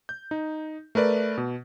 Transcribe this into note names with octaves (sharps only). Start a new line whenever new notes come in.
G6
D#4
A3 A#4 B4 D5
B2